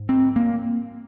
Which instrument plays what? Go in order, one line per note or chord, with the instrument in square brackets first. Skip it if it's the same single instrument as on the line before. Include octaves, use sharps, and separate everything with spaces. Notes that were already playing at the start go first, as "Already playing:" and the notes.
Already playing: [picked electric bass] G#2
C4
A#3